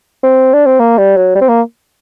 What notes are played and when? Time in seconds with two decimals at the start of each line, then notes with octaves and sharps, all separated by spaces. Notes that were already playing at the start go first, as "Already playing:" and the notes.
0.23 C4
0.54 D4
0.66 C4
0.80 A#3
0.98 G3
1.17 F#3
1.35 G3
1.41 C4
1.49 A#3